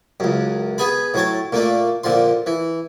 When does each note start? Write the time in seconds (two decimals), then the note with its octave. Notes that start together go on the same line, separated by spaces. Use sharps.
0.20 C#2 F#2
0.78 B3 G#4 G#5 B5
1.14 A2 F#3 C#5 A5
1.52 A#2 A3 A#3 D4
2.04 A#2 D3 F3 C6
2.46 E3